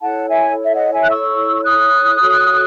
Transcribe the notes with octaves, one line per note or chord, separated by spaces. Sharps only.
E4 A4 C#5 F#5 A5
E5 G#5
E5
D#5 F#5
E5 G#5
F#6
C#6 E6
D#6 F#6
F#4 A4 C#5